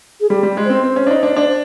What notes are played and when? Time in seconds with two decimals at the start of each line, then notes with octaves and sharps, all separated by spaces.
0.20 G#4
0.29 G3 G4
0.43 G3
0.57 G#3
0.65 C4 C5
0.84 C4
0.96 C#4
1.07 D4
1.11 D#4
1.23 D4
1.36 D4